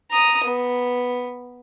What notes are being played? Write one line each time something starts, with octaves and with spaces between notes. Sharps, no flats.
A#5 D#6
B3